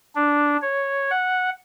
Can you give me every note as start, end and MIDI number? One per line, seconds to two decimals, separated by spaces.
0.15 0.57 62
0.62 1.10 73
1.11 1.50 78